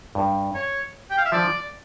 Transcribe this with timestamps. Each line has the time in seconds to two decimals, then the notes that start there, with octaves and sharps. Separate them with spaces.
0.15 G2
0.54 C#5
1.11 G5
1.18 F5
1.25 E5
1.32 F3 D5